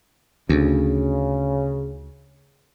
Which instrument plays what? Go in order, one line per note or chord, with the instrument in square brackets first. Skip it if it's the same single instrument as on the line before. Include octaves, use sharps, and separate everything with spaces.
[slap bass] D2 [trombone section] C#3